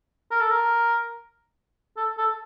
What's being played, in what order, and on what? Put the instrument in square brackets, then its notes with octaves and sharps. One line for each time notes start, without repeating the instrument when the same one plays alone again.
[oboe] A#4
A4
A#4
A4
A4